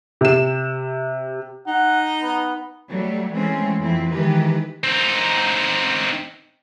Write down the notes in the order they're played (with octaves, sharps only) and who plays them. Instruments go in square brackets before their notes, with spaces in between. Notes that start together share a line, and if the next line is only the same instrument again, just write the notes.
[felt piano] C3 E7
[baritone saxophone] D#4 [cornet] F#5
[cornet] B3
[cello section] F#3 G3 A3
E3 G#3 A3 C4 C#4
F2 E3 F3 C4 E4
D#3 E3 G#3 G4 B4
[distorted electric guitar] C4 D#4